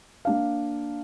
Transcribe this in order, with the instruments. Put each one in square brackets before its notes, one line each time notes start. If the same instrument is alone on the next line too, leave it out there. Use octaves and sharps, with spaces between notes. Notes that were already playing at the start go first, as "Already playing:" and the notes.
[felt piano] A#3 D4 F5